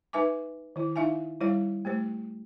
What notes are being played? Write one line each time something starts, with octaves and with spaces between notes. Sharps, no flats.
D#4 B4 E5 G#5 D6
D#3 E4
D#4 E4 E5 F5 G#5
G3 E4 C5 C#5 F5
A3 G4 C5